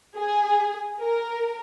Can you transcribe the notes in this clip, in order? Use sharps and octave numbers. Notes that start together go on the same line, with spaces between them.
G#4
A#4